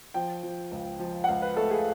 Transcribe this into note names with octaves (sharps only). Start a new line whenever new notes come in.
F3 G5
F3
C#2
F3
F#5
C#2 F5
B4
A3 A4
G#4